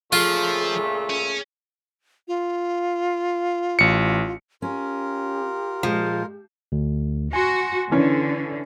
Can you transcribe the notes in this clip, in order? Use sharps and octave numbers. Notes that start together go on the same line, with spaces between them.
A#2 C#3 F3 A3 F4 G#4
C#4
F4
A1 C#7
C#4 F4 G4 A#4
A#2 F3 G#3
D2
F#4 G#5 C6
D3 E3 C#4